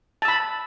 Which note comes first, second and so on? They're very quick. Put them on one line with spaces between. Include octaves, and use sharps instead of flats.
A5 E6 B5